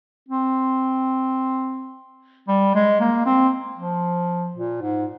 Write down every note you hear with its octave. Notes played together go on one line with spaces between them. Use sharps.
C4
G3
G#3
A#3
C4
F3
A#2
G#2